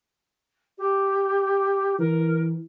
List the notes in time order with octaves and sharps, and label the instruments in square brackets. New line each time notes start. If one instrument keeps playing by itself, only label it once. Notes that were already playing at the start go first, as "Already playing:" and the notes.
[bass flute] G4
[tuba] E3 [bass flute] A#4